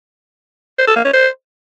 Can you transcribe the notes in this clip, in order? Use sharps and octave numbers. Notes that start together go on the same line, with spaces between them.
C5
A4
A#3
C#4
C5